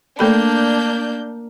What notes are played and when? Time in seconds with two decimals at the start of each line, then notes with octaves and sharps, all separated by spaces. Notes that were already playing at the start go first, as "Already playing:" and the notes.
0.19 A3 A#3 D4 A4 B5 G6